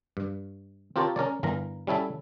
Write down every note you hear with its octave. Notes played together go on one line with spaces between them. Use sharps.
G2
C4 F4 G4 A#4 C#5 A5
C#4 A#4 C#5 D5
G1 E3 A#4 A#5
G3 C#4 E4 A4 E5